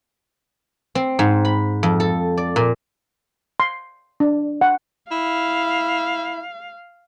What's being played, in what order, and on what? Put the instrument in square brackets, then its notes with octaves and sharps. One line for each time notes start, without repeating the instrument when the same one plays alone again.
[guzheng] C4
G#2
B5
F2
A4
D5
A#2
[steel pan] C6
D4
F#5
[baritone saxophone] E4 [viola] F5